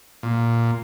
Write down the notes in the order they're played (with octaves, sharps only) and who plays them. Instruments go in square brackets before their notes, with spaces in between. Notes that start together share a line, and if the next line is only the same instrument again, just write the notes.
[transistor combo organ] A#2